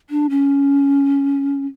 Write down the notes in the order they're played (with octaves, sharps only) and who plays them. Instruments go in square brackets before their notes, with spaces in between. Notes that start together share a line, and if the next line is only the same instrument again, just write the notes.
[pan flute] D4
C#4